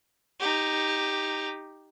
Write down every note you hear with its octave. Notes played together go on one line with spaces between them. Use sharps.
D#4 G4